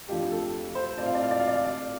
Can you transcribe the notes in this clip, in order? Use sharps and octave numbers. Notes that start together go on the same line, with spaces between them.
F2 F3 A3 D4 F4 G4
A4
C5
A2 A3 C4 F4 D5
F5
D5
F5
D5
F5
D5
F5
D5